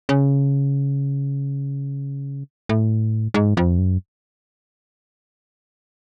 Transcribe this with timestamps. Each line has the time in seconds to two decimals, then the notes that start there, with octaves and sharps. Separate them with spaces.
0.09 C#3
2.69 A2
3.34 G#2
3.57 F2
3.78 F#2